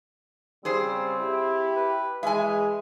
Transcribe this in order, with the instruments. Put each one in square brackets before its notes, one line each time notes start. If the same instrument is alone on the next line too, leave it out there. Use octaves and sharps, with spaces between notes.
[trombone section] C#3 G3 [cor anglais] C4 [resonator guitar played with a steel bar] G#4 C5
[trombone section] E4 G4
[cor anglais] B4
[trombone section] E3 G#4 [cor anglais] G#3 [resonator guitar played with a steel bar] E5 G#5